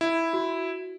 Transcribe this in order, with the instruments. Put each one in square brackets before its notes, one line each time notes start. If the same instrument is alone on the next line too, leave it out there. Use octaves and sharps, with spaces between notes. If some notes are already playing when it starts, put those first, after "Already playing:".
[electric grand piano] E4
[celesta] F#4